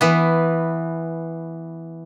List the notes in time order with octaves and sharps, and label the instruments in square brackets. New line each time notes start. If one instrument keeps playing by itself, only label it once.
[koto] E3 B3